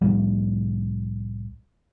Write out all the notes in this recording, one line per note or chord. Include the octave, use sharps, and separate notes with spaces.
C2 A2 F3 G3